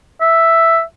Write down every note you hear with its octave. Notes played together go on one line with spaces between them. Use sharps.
E5